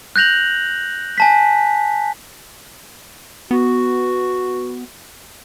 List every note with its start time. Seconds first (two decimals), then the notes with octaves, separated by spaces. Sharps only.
0.16 F#6 G6 A#6 F7 F#7
1.18 G#5 A5 B6
3.51 B3 F#4